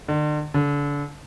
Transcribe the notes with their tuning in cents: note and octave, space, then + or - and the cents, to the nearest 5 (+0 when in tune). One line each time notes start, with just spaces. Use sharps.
D3 +40
D3 -30